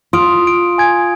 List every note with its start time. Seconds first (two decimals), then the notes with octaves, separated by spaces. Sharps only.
0.13 F4 C6 D#6 D7
0.47 D7
0.78 G#5 G#6 D7